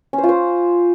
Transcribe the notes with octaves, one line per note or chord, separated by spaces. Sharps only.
C#4
C5
F4
C5